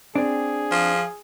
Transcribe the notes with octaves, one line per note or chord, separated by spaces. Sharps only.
C4 D4 G#4
F3